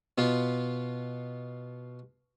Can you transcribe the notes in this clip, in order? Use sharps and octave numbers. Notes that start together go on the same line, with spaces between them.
B2 B3 F4